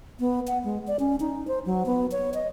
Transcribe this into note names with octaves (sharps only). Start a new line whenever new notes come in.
B3
F#5
G#3
D5
C#4
D#4
C5
F#3
B3
C#5
D#5